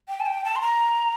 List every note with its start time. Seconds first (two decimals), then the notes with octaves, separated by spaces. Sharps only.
0.08 G5
0.20 A5
0.26 G5
0.45 A5
0.56 C6
0.61 A#5